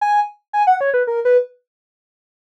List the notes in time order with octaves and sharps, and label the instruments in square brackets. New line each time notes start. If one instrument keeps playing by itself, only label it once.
[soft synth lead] G#5
G#5
F#5
C#5
B4
A#4
B4